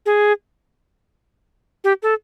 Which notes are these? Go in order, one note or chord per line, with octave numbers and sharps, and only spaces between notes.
G#4
G4
A4